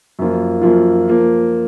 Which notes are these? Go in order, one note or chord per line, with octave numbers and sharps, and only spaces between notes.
F#2 F3 A#3 F4
F#2 F3 A#3 F4
F3 A#3